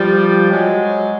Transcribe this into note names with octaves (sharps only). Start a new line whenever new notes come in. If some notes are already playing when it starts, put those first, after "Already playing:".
Already playing: F3 G3
F#3 G#3